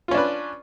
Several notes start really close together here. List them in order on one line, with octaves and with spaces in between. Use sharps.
F4 C#4 D4 B4